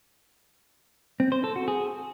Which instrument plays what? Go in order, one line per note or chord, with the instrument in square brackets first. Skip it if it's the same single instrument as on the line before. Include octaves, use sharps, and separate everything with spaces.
[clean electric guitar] C4
C5
A4
F#4
G#4